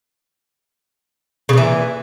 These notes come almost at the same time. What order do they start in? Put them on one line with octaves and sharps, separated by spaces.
C#3 A#2 E3